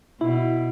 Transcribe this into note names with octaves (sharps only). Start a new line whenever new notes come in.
B2 E4